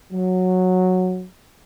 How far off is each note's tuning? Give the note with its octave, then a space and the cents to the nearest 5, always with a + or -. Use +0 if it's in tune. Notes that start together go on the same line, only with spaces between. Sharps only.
F#3 -10